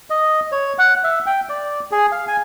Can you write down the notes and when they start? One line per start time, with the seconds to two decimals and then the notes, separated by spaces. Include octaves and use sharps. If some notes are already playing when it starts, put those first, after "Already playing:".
0.10 D#5
0.52 C#5
0.78 F#5
1.04 E5
1.26 G5
1.49 D5
1.91 G#4
2.12 F5
2.28 G#5